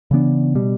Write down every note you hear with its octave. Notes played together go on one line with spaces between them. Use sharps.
C#3 E3 B3 D4
B2 G3